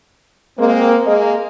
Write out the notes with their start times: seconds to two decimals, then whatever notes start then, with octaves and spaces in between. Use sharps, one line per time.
0.58 G#3 A#3 C4
1.07 G#3 A#3 G#4 D#5